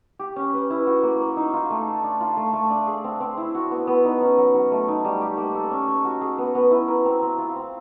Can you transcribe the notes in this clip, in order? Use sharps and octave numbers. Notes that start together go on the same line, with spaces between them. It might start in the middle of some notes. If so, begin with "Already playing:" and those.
G4
C#4
B4
E4
F#4
A#3
A#3
D#4
F4
A3
A4
D4
F4
A3
A3
D4
G#4
C4
C4
E4
F#4
B3
B3
D#4
C#4
F#3
F#3
A3
D#4
G3
G4
A#3
A4
C#4
C#5
F#4
G#4
B3
B3
E4
A#4
C4
C4
F4
C4